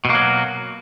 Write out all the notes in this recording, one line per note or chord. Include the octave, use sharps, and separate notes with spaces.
B2 F#3 A#3